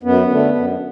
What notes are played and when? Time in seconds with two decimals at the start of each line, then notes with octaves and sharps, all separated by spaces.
0.03 F#2 B3
0.30 D3 A3
0.55 F#2